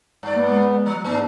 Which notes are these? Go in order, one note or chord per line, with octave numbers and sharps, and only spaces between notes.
G2 D5
A#3 B3
G#3
F3
G#2 A3 B3 D4 D#4